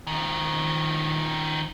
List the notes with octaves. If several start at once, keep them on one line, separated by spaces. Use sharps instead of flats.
D#3 F3